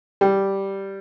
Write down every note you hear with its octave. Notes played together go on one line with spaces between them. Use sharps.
G3